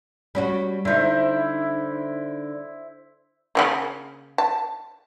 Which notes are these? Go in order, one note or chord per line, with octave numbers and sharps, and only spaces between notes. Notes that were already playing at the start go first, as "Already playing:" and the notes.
G3 C#4 F#4 B5
D3 D#4 E4 C5 E5
C#3 F#3 A#3
A5